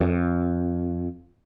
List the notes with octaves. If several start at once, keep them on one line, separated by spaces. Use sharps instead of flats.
F2